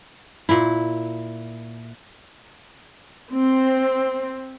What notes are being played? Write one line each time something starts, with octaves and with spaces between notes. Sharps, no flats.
A#2 E4
C4